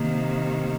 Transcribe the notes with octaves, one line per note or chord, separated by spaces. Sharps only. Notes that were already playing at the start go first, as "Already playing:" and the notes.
Already playing: C3 D#3 A#3